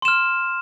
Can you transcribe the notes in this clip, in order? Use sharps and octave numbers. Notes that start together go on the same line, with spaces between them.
C6 F6 E7